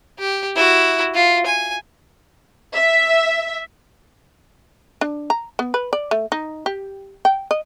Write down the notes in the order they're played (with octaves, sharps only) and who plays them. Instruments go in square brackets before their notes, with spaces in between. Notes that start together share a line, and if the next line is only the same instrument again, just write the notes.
[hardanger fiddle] G4
E4 F#4
F4
G#5
[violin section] E5
[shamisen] D4
A#5
B3
B4
D5
A3
D#4
G4
G5
D#5